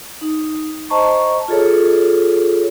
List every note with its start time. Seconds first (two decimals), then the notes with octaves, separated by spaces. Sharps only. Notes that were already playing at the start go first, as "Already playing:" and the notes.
0.21 D#4
0.90 C5 D#5 A5 A#5 C#6
1.48 F4 G#4 A4 C#5